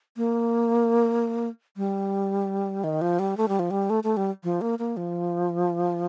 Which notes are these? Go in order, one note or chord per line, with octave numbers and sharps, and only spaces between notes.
A#3
G3
D#3
F3
G3
A3
G3
F3
G3
A3
A3
G3
F3
A#3
A#3
F3